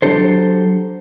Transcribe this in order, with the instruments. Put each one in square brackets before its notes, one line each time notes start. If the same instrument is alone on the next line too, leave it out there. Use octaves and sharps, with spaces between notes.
[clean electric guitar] F#3 B3 D4 G4 A4 C5